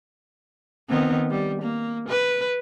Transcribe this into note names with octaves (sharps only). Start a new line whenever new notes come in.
D#3 B3 C4
G3
A#3
B4